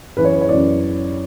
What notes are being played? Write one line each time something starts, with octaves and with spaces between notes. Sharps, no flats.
F#2 E3 B4
C#5
B4
C#5
F#2 E3 D5